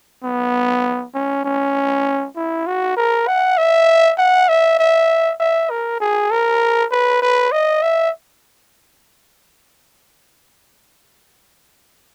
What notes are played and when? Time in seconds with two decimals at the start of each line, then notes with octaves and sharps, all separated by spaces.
0.24 B3
1.14 C#4
1.45 C#4
2.36 E4
2.67 F#4
2.97 A#4
3.27 F#5
3.58 E5
4.18 F#5
4.48 E5
4.79 E5
5.40 E5
5.70 A#4
6.00 G#4
6.31 A#4
6.92 B4
7.22 B4
7.52 D#5
7.83 E5